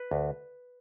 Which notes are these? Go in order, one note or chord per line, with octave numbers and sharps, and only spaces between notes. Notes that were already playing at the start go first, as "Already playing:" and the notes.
Already playing: B4
D2